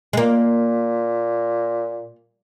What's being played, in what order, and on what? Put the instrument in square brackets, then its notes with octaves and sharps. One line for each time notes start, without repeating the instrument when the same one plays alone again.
[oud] G#3
[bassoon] A#2 [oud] A#3